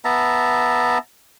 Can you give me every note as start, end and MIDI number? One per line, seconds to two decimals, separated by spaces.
0.05 0.98 59
0.05 0.98 76
0.05 0.98 81
0.05 0.98 82